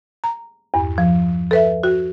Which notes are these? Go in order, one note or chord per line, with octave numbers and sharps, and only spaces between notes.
A#5
E2 G2
F3
A4 B4 E5
F#4